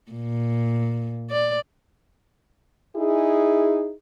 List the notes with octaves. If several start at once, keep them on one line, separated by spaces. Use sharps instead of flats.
A#2
D5
D#4 E4 G#4